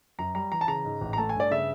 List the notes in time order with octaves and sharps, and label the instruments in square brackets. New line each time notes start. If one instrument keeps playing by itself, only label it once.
[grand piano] F#2 A#5
G3 A#5
E3 A#5
A5
C#3 A#5
G#2
A1
A#5
A3 A5
G#5
G2
D5
C#3 E5